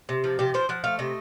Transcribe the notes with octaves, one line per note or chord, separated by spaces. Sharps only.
C3
F3
C3 G4
F3 C5
F3 F#5
A3 F5
C3 D#5